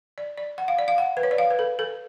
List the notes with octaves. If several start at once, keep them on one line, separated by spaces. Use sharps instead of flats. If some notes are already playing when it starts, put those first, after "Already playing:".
D5
D5
F#5
F5
D5
F5
F#5
B4
C#5
D5
F5
B4
A4
A4